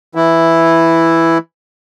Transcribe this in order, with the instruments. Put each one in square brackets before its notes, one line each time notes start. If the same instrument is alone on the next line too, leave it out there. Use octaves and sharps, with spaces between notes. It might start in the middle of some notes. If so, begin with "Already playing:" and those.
[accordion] E3 E4